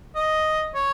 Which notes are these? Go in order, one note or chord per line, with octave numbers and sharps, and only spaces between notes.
D#5
C#5